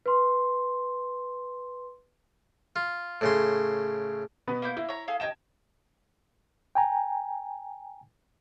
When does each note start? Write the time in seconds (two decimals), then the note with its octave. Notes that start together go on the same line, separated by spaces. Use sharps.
0.06 B4 C6
2.76 F4
3.21 A2 C#3 C6
4.47 B2 B3 B4
4.62 A#3 E4 G6
4.77 A#3 E4
4.89 C#5 A#5
5.08 G#4 A4 F5
5.20 D#5 G5 A5 G#6 E7
6.75 G5 G#5 A#5